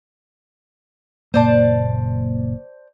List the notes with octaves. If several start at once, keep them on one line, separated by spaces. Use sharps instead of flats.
F#1 A#2 A#3 C5 D5 A5